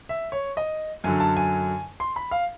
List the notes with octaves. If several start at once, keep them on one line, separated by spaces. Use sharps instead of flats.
E5
C#5
D#5
F#2 D3 F#3 G#5
A5
G#5
C6
B5
F5